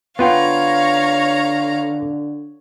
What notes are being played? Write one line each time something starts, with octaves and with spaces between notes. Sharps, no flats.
D3 B3 F4 C#5 F5 G5 A#5